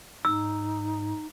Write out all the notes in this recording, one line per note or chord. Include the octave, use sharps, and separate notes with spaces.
G#2 D#4 E6